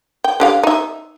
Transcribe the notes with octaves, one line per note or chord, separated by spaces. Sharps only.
G5
D3 G4 F5
D#4 E5